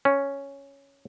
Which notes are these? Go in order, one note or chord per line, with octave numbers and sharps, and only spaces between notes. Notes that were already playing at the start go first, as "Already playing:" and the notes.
C#4